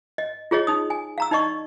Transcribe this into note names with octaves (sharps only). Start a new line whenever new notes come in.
D#5
F4 G#4 C#5 D#5
D#4 D#6
G#5
F5 A#5 E6
D#4 D5 D#5 C#6